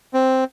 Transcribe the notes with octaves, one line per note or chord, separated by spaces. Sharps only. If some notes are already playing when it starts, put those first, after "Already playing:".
C4